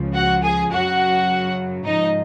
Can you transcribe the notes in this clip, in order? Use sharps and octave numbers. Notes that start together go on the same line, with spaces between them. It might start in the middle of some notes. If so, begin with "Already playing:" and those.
Already playing: C#2 C#3 F3
F#4 F#5
G#4 G#5
F#2 C#3 F#3 F#4 F#5
G#2 F3 D#4 D#5